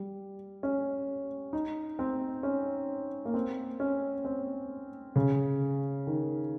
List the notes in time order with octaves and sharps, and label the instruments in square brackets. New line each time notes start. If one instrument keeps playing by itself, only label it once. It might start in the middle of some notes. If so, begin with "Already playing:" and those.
Already playing: [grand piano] G3
C#4
D#4
C4
C#4
A#3
C4
C#4
C4
C#3
D#3